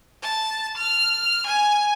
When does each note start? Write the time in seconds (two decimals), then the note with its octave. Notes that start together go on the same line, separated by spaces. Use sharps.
0.23 A5
0.77 F6
1.46 G#5